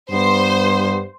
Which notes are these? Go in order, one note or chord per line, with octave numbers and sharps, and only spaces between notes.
G2 B3 C5